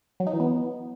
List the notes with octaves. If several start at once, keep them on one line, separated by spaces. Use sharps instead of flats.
F#3
D#4
E3
B3